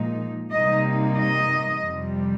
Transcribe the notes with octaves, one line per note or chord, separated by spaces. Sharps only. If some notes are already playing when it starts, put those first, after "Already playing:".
Already playing: A#2 F3 G#3 D#4
C3 G3 A#3 D#4 D#5
D#5
F2 C3 G3